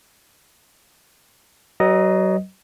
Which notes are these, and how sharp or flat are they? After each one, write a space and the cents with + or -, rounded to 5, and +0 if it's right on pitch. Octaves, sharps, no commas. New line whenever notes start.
F#3 +35 B4 +0 D#5 +0